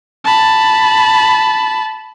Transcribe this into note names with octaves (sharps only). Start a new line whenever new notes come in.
A5 B5